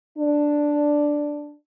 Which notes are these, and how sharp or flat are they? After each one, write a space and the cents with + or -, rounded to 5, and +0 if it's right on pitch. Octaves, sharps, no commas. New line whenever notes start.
D4 +0 D5 +0